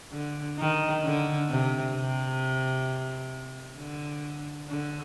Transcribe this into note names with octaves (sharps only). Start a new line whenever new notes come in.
D3
D#3
D3
C3
C3
D3
D3